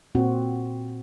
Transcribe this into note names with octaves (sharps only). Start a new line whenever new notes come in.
A#2 C4 F#4